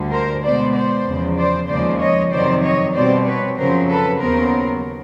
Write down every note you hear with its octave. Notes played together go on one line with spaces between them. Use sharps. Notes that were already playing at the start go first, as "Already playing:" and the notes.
Already playing: D2 D3 G3
A#4 C5
B2 G#3 B3 C5 D5
C5 D5
E2 C#3 F3
C5 D5
D#2 C#3 F3 G#3 C5 D5
C#5 D#5
F2 C3 D#3 F#3 C5 D5
C#5 D#5
B2 G3 C4 C5 D5
B4 C#5
F2 C#3 F#3 A#4 C5
A4 B4
D#2 C#3 F#3 B3 A#4 C5